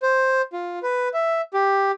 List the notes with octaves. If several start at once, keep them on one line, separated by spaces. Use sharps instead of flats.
C5
F4
B4
E5
G4